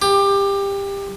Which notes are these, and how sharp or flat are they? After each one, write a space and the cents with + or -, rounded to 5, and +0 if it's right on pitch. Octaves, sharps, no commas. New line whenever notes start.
G4 +20